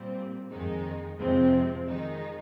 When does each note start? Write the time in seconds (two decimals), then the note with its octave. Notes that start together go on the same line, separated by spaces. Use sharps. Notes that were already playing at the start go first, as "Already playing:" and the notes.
Already playing: A#2 G3 C4
0.51 F2 D#3 G#3 D#4
1.19 F2 C3 F3 G#3 C4
1.88 D#3 G#3 D#4